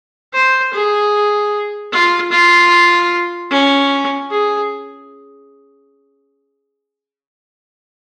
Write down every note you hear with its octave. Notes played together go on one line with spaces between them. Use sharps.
C5
G#4
F4
F4
C#4
G#4